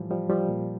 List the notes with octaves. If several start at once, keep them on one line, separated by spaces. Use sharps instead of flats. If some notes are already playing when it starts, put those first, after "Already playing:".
Already playing: A2 E3 F3 G3
F3 G3
F3 G3
A#2